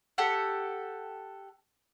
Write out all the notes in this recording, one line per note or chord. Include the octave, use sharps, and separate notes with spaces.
G4 A4 F#5